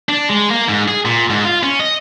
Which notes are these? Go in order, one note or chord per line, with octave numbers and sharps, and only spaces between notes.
D4
G#3
A#3
G#2
G#4
A#2
G#2
F4
C#4
D#5